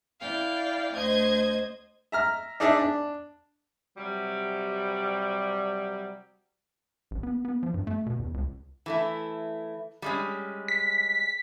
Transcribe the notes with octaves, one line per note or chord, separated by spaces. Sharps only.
E4 D5 F5 G5
D2 C5 D#5 G#6
E5 A#5 F6
D4 D#4 G#4 D5 E5
D4
C3 F#3 G3
A1
B3
B3
F3
G2
A3
B2
E2
C#2
E3 A3 E4
G3 G#3 C#4
B6